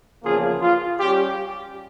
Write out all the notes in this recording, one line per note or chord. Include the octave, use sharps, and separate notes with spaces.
E2 C#3 F3 A#3 F4 G#4
F4
G3 C#4 G4